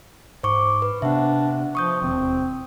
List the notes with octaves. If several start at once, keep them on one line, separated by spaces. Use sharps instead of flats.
G#2 C5 C#6 D6
B4
C3 B3 D4 E5 F#5
F3 C#6 D#6 G6
E1 D#2 C4